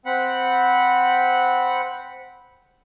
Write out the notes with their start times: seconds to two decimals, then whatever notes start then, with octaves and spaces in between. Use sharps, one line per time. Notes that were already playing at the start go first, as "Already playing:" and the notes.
0.06 C4 F#5 B5